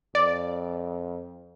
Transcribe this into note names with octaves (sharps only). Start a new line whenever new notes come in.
F2 D5